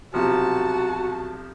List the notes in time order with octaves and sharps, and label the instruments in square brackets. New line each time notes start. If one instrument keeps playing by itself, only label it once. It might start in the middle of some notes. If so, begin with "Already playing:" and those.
[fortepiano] B1 C3 F3 [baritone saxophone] F#4 [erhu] A5